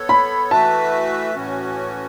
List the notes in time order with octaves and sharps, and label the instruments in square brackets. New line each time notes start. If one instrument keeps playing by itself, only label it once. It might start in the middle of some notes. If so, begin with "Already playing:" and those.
Already playing: [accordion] B3 A4 C#5
[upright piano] B5
[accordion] E3 A3 F#4 B4 E5 [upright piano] A5
[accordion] A2 E3 C#4 F#4